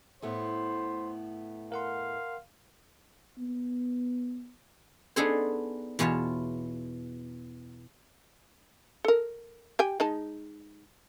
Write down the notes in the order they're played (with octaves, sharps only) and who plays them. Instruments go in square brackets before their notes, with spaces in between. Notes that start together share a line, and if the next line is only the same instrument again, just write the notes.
[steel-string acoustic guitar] A2 A3 B3 [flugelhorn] C5
[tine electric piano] A#4 F#5 C6 [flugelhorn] F5
[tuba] B3
[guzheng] B3 D4 D#4 G#4 A4 C5
E2 B2 F4 C#5 A5
[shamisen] A4 A#4
G4 G5 G#5
G#3 D#4 A5